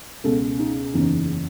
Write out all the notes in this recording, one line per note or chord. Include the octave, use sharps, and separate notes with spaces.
C#2 B2 A4
D#4
F#1 E2 C#3 E3 D#4